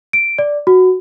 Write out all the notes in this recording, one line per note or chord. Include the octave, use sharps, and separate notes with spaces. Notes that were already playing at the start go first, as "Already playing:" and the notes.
D7
D5
F#4